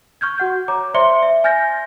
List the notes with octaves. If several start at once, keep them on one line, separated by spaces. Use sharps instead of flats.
C#6 F6 G6 G#6
F#4 F#5 G6
C#5 A#5 D6
C5 D5 E5 C6 C#7 G7
E5
G#5 F6 G6 A6 A#6